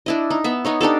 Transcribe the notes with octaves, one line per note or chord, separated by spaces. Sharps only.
D4 E4 D#5
D#4
B3 E5
B3 D#4 C#5
D4 D#4 G4 A4